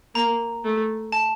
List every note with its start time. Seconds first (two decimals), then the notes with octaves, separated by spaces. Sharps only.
0.15 A#3 A#5
0.64 A3
1.12 A5